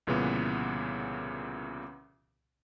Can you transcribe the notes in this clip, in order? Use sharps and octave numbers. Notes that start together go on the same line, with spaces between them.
C2 A#2 C#3 E3 B3